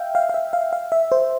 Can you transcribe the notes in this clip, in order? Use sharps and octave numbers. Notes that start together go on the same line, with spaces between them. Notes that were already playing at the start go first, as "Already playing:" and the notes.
Already playing: E5 F5 G5
F5
F5
E5
F5
F5
E5
C5